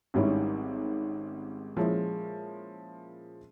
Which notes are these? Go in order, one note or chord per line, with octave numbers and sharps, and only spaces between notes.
G#1 G#2 G3 C#4 E4
A#2 F3 G#3 C#4 E4